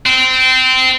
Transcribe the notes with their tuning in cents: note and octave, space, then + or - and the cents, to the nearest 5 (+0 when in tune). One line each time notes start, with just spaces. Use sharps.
C4 -20